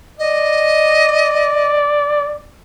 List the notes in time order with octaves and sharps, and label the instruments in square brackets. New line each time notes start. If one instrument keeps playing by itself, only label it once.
[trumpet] D5 [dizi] D#5